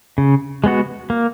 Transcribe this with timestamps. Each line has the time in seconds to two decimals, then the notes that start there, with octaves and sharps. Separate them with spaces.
0.18 C#3
0.64 G#3 B3 F#4
1.10 A#3